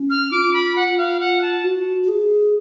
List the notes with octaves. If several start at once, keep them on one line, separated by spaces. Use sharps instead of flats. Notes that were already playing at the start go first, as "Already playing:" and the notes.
Already playing: C#4
F6
F4 D6
B5
F#5
F5
F#5
A5
F#4
F#4
G#4